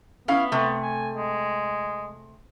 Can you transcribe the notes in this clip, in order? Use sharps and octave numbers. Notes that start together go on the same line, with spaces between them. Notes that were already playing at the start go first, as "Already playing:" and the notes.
B3 C#4 E4 F5
C3 A3
G#5
G#3